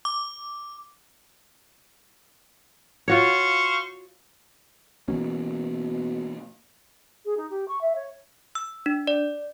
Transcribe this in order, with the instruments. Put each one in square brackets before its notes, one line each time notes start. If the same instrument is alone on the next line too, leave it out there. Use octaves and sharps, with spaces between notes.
[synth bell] D6
[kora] F4 F#4 C#5 [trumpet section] C5 F5 C#6
[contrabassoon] B2 [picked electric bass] E3 A#3 C#4
[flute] G#4
D#4
G4
C#6
E5
C#5
[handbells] E6
D4
D5